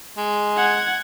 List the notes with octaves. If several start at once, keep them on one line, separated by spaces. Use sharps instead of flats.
G#3
F#5 G#6